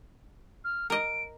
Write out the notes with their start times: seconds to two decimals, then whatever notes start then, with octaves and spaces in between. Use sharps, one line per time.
0.64 F6
0.90 A#4 D#5 D7